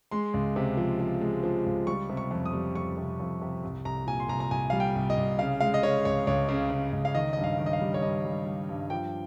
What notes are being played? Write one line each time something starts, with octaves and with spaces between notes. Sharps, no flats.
G#3 C6
C#2
C3
F3
F3
G#3
F3
C#2
G3 C#6
C3
C#6
F2
D#6
G3
F2 C#6
C3
F2
C3
C2
C2 A#5
A#2 G#5
C6
C2 A#5
A#5
C2 G#5
G3 F5
G5
C2
D#5
C2
C#3 F5
G#3 F5
D#5
C#3 C#5
C#2 C#5
C#2 C#5
C#3
C#3
C#2
F5
D#3 D#5
G2 D#5
F5
D#3
D#5
F5
G3
C#5
G2 D#5
G3
G3
G2
F3 G5